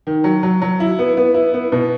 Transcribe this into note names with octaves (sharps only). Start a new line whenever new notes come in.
D#3
F#3
F#3
F#3
E4
B3
B3
E4
B3
B2